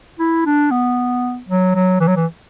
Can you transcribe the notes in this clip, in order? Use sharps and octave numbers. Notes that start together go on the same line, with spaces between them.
E4
D4
B3
F#3
F#3
E3
F#3
E3